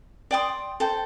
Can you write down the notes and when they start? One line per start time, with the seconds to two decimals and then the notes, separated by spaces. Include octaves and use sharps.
0.31 D5 G5 C6 D#6
0.80 A4 C5 G5